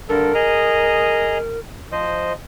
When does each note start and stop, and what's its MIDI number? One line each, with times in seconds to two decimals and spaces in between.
0.09 0.32 43
0.09 0.32 50
0.09 0.32 69
0.09 1.59 70
0.34 1.38 68
0.34 1.38 75
0.34 1.38 82
1.92 2.33 53
1.92 2.33 72
1.92 2.33 75